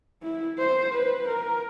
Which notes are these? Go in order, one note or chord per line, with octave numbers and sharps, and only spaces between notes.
E4
C5
B4
A#4